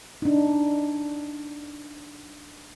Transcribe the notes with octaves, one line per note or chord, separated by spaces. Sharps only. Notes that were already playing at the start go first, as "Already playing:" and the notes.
D4 D#4